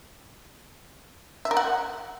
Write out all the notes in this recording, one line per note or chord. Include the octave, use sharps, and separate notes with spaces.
E5
A#4
F#5